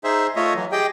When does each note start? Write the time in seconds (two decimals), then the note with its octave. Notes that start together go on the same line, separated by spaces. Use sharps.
0.04 D#4 G#4 C5 E5
0.36 A3 F4 C#5 D#5 E5
0.55 E3 F#3
0.72 G4 G#4 D#5 G5